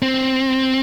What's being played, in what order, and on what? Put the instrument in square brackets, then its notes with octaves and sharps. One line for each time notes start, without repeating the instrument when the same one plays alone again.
[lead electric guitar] C4